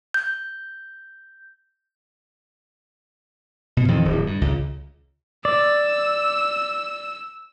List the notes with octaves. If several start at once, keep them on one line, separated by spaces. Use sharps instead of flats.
G6
B2
F2 D#3 E3
D1
G2
C#2
D5 E6